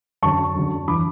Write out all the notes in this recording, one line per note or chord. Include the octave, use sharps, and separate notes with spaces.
F#2 D3 A5 C#6
F#2 D3
E3 B5 D6